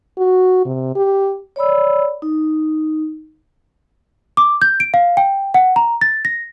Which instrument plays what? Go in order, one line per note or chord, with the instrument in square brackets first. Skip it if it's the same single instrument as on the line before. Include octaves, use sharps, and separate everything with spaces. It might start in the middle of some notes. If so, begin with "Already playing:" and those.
[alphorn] F#4
C3
G4
[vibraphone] C#5 D5 B5 E6
D#4
[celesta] D6
G6
D7
F5
G5
F#5
A#5
A6
A#6